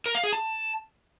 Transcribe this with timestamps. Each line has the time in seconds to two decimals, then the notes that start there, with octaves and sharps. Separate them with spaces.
0.06 A#4
0.15 F5
0.24 G#4
0.33 A5